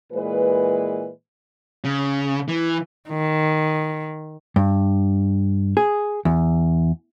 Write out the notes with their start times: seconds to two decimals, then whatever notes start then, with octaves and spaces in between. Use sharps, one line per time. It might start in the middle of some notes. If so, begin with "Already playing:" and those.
0.12 A#2 E3 G#3 B4
1.84 C#3
2.48 E3
3.10 D#3
4.56 G2
5.77 G#4
6.25 E2